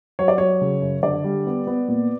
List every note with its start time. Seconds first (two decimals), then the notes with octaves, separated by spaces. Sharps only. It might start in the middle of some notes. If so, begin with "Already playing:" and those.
0.19 F#3 C#5
0.28 D5
0.38 F#3 C#5
0.61 C#3
0.82 F#2
1.03 D3 D5
1.24 G3
1.46 B3
1.67 B3
1.88 A#2